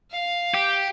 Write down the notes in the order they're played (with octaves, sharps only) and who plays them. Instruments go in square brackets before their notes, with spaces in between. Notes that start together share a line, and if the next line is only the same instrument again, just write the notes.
[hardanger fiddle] F5
[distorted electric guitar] G4